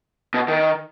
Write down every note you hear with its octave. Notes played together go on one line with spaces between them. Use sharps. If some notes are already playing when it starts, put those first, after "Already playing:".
B2
D#3